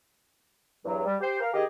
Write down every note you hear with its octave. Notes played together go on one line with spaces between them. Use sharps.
E2 G2 F#3
G3
G4 C5
A#4 F5
D#3 G4 G#4 D#5